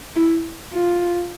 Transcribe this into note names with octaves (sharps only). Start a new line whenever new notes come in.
E4
F4